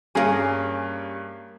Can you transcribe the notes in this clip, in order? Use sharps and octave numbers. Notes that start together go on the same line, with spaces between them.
G2 A#3 C#4 G#4 G#5